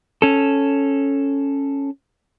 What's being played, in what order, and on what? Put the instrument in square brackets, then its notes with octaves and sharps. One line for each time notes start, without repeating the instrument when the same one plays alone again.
[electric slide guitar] C#4 A4